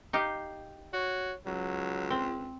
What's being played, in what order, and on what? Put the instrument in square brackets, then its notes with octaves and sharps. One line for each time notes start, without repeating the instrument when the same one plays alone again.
[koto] D#4 G4 F5
[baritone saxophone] F#4 [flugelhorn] C#5
[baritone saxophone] C#2 [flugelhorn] F#3
[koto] C4